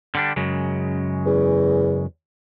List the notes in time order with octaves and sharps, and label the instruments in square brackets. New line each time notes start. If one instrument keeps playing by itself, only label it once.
[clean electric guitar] D3 G3 D4
F#2 C#3 G#3
[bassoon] E2